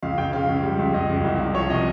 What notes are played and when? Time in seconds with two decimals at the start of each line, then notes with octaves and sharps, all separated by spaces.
0.03 C#2 F5
0.18 C#2 G5
0.33 C#3 F5
0.49 C#2
0.63 G3
0.79 C#2
0.94 C#2 D#5
1.09 C#2
1.25 C2
1.40 C2
1.55 F3 C#5
1.70 C3 D#5